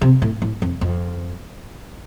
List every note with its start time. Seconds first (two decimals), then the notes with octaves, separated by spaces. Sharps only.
0.01 C3
0.22 A2
0.42 A2
0.62 F2
0.81 F2